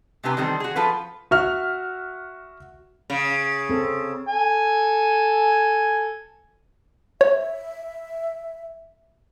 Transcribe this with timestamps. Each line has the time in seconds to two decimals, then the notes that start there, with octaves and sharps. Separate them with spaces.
0.23 C3 C4 D4 G4 B4 G#5
0.37 D#3 E3 G3 C4 A4 C5
0.60 F#4 G#4
0.76 F3 F4 A4 B4
1.31 F#4 E5 F6
3.10 C#3
3.69 C4 A4
4.28 A4 G#5
7.21 C#5 E5